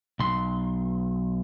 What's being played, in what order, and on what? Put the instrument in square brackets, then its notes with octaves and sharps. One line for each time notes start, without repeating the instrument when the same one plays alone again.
[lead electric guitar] B1 C6